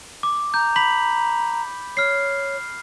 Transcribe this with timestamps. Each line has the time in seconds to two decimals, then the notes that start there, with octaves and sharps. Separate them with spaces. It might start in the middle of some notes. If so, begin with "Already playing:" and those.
0.23 D6
0.54 A#5 G6
0.76 B5 B6 F#7
1.97 C#5 F6 C7